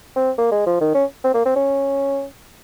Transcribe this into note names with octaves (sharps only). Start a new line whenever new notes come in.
C4
A#3
G#3
F3
D#3
C#4
C4
A#3
C4
C#4